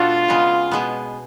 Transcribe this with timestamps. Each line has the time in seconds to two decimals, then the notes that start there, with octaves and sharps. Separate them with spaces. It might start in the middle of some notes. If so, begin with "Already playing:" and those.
Already playing: B2 A3 D4 F4 F#4 A4
0.28 C#3 G#3 B3
0.71 B2 G#3 B3